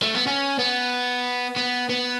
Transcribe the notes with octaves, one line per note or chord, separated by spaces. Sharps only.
A3
B3
C#4
B3
B3
B3